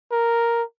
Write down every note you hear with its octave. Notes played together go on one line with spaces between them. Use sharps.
A#4